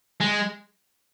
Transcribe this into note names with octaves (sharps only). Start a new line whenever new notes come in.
G#3